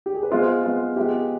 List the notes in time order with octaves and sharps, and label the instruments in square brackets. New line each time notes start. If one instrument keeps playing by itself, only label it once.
[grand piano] G4
G#4
B4
[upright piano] G#3 B3 F4 [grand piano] C5
[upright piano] G#3 B3 F4
[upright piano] G#3 B3 F4 [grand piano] G4